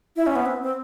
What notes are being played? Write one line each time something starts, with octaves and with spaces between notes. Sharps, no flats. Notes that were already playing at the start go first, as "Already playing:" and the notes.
E4
C#4
B3
C4
C4